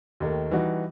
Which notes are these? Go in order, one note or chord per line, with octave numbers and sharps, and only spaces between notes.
D#2 D#3 A3
E3 G3 D#4 F#4